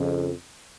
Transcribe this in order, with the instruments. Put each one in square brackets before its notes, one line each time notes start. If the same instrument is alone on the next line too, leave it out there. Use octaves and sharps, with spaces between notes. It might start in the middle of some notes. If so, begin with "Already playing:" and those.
Already playing: [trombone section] F2 C#3